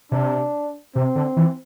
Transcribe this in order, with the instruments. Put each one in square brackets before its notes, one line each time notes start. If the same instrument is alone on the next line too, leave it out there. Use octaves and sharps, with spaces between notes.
[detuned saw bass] C3 [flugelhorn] D4
[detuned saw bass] C3 [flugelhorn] C4
[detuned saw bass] D3
E3